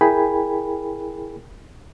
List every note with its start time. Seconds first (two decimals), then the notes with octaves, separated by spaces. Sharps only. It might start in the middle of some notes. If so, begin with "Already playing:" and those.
0.01 E4 G#4 A#4 G5 G#5 B5